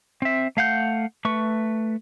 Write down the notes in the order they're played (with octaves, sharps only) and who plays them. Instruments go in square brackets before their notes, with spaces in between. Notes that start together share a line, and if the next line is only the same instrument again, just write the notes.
[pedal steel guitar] C4 E5
A3 F5 F#5 G6
A3 B4 C#6